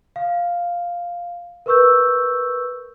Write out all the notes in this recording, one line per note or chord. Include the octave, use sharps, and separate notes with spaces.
F5
A#4 B4 C#6 E6 G6